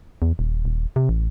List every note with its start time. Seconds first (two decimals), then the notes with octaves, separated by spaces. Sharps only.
0.22 E2
0.39 D#1
0.65 D#1
0.96 C3
1.09 A1